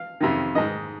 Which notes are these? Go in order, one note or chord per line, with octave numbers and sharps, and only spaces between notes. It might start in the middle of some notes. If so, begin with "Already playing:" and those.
Already playing: F5
F2 C3 D#3
G#2 D#3 D#5